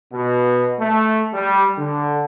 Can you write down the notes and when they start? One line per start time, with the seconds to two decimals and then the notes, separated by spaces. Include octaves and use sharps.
0.13 B2
0.79 A3
1.34 G3
1.78 D3